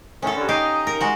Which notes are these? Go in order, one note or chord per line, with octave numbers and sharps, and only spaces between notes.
A2 D#3 C#4 A4
G2 D3
D#4 G4 D#5 F5
A#4
G#3 F#4